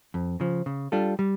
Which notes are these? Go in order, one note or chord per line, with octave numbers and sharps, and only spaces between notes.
F2
C#3 F3
C#3
G3 D4 F4 A4
G3